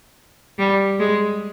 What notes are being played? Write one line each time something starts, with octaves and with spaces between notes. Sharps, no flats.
G3
G#3